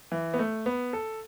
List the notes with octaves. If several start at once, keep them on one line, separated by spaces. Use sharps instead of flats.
E3
B3
A3
B3
A4